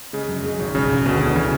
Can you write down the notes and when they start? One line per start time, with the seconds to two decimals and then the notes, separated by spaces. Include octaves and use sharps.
0.13 C#3 G#3
0.29 F#2
0.44 G#3
0.59 G#1
0.75 E1 C#3
0.90 E1
1.06 D2 B2
1.21 B2 D3
1.36 C#3 E3